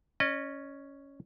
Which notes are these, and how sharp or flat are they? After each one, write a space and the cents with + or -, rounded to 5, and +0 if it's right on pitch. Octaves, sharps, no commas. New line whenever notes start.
C#4 +0 D#5 -35